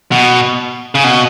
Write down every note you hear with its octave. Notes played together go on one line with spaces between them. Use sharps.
B2
C#3
B2